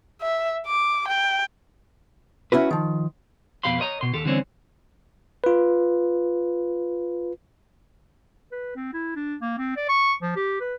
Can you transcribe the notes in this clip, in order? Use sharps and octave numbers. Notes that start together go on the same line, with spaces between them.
E5
D6
G5
C#4 E4 F#4 B4
D#3 F3
F2 B2 G4 F5 B5 C6
A#4 C#5 D#5 A#5
B2 C6
D#2 G4 A4
D3 E3 G3 C4 C#4
F4 B4
B4
C4
E4
D4
A#3
C4
D5
C#6
F3
G4
B4